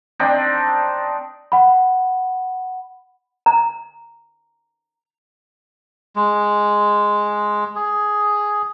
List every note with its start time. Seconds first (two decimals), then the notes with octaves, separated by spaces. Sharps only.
0.20 C4 D4 D#4
1.52 F#5 B5
3.46 A#5
6.16 G#3
7.76 G#4